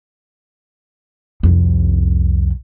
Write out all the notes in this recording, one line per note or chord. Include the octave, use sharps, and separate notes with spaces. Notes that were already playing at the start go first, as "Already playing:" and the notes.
C2 F2